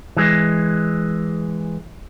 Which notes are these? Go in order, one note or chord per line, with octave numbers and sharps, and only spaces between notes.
E3 G#3